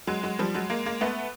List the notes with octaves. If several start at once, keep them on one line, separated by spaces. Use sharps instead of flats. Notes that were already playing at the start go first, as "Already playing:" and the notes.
F#3 G#3
F#3 G#3
F3 G3
F#3 G#3
G#3 A#3
G#3 A#3
A3 B3